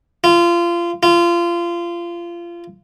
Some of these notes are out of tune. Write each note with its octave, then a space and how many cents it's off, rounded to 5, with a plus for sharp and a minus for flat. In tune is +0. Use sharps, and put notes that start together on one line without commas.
F4 -25
F4 -25